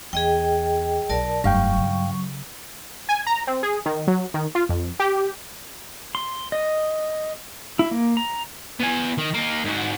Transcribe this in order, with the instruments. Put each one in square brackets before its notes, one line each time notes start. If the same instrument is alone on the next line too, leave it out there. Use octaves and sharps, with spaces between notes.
[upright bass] E2 [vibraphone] G#4 D#5 G5
[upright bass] B1 [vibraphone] A#4 D5 A5
[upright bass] F1 [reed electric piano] G2 F5 G5 [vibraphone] F#3 C#6
[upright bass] C#3
[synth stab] G#5
A#5
C4
G#4
D#3
F#3
D#3
F4
F2
G4
[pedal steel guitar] C6
D#5
E4
A#3
A#5
[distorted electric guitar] B3 G#5
D#3
A#3 D#4
G#2 F#4